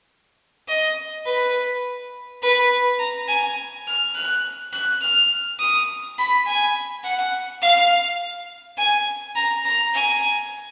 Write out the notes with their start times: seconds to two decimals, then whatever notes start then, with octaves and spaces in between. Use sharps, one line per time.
0.68 D#5
1.25 B4
2.42 B4
2.99 A#5
3.28 G#5
3.87 F6
4.15 F#6
4.73 F#6
5.01 F6
5.59 D#6
6.18 B5
6.46 G#5
7.04 F#5
7.62 F5
8.78 G#5
9.35 A#5
9.65 A#5
9.94 G#5